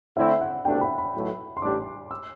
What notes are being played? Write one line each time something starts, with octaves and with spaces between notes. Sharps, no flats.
D3 A3 C4 E4 E5
F#5
C2 B2 A3 D4 G5
B5
B5
B1 A2 F#3 A3
C6
A1 A2 G3 D4 G4 D6
E6